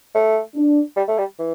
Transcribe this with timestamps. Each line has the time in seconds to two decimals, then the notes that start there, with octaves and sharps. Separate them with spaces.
0.15 A3
0.55 D4
0.96 G3
1.08 A3
1.18 G3
1.39 E3